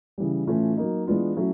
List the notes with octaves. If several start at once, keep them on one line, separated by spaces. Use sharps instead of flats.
C#3 E3 G3
A2 E3 A3 C#4 F4
F#3 A#3 D#4
E3 G#3 B3 D4 F4
F#3 A3 C#4 E4